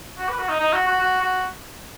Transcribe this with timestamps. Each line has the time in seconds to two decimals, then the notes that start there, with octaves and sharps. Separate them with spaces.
0.18 F#4
0.29 B4
0.39 F#4
0.49 D#4
0.60 D#4
0.73 F#4
0.87 F#4
1.01 F#4
1.22 F#4